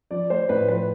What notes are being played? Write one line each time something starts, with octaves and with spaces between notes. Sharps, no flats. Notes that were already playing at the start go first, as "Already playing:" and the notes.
F3 D5
A3 C5
A2 B4
F3 B4